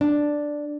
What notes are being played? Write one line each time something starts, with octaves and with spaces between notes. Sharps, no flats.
D4